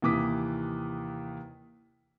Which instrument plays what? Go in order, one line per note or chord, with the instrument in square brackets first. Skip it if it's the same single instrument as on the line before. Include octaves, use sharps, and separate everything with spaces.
[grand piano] D#2 C3 E3 D6 D#6 B6